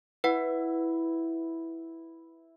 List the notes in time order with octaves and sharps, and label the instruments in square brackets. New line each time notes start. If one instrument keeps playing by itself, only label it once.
[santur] E4 [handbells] B4 F#5